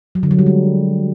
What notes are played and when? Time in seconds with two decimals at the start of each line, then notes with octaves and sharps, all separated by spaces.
0.15 F#3
0.23 D3
0.31 F#3
0.39 G3
0.46 G#3